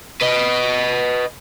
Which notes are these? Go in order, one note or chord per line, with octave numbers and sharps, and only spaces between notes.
B4 D#5